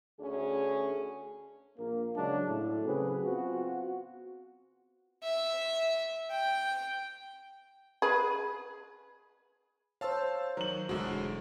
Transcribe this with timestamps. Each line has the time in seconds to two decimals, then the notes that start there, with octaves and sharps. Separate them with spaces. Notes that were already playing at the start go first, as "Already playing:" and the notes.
0.19 D2 C#4 G#4
1.77 A#1 A#3
2.16 C#3 F#3 G#3 D4
2.48 A2
2.85 C#3 F#3 C4 G#4 B4
3.24 B3 C4 F4 F#4
5.23 E5
6.31 G5
8.02 G#4 B4
10.01 C5 C#5 F5 A5 E6
10.57 D#3 F#3 F#7
10.89 E1 D2 D3 G#3 F#4